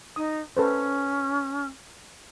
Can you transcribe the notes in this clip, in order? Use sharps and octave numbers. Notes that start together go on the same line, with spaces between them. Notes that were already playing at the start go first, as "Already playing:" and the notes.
D#4 D#6
C#4 A4 B4 C5